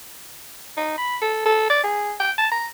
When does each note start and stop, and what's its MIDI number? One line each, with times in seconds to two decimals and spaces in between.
0.77 0.93 63
0.98 1.17 83
1.22 1.42 69
1.46 1.65 69
1.70 1.83 74
1.84 2.13 68
2.20 2.32 79
2.38 2.48 81
2.52 2.68 82